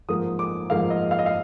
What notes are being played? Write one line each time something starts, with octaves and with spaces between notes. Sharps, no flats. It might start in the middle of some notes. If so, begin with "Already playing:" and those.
G#2 F3 A#3 D#6
D6
G#2 F3 A#3 F5
D#5
F5
D#5
F5